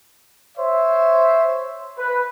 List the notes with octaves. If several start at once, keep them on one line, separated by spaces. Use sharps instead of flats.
C5 C#5 E5
B4